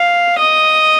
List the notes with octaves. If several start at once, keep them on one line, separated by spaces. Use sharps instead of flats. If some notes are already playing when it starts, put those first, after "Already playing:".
Already playing: F5
D#5